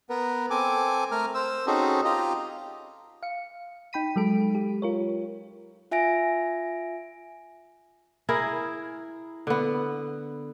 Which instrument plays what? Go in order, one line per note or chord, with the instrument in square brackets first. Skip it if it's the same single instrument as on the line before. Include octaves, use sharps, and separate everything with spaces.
[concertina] B3 A#4 B4
C4 A4 G#5 D6
A3 A#4 F6
C5 E6
C4 C#4 D#4 F#4 G#4 A4
F4 G4 D#5 A#5
[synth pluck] F5 C#7
D#4 G5 B5 B6 D#7
F#3 G#3 A4 D7
G4
F4 A#4 C#5
[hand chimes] F4 E5 G#5 A#6 D7
[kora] E4 G#4 A#4
D3 B3